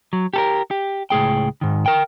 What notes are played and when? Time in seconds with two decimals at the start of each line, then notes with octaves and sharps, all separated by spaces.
0.13 F#3
0.34 G4 A4 A#4
0.71 G4
1.10 C#2 A2 G#4 G5
1.61 G#2 D#3
1.86 A#4 G5